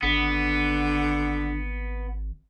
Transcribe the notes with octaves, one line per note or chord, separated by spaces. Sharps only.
G#1 D3 B3